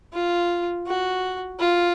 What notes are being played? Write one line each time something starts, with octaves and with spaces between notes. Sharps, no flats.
F4
F#4
F4